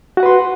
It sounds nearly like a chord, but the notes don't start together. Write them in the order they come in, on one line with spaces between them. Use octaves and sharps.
F#4 F#5 B4 C6